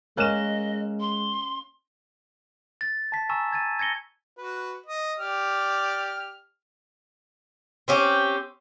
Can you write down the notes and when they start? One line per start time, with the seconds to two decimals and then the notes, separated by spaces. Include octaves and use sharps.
0.17 G#3 A#3 C#4 D#5 F#6 E7
1.00 C6
2.81 A6
3.12 A5 B6
3.29 G#5 A#5 C#6 E6 E7
3.52 G#6 A6 D#7
3.79 G#6 A#6 C#7 G7
4.37 F#4 B4
4.86 D#5
5.18 G4 D5 F6
7.88 C4 C#4 G4